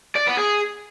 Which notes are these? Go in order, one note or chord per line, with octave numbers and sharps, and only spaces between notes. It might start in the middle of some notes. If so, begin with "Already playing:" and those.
D5
B3
G#4